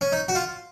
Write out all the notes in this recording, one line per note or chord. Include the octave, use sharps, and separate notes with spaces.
C#4
D#4
F#4
F4